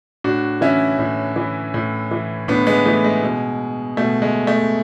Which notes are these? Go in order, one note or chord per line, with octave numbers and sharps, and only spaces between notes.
A2 D4 F#4
E3 C#4 E4
A2
E3
A2
E3
A2 B3 D4
G#3 B3
E3 A3
G#3
B2
B2 A3
G#3
A3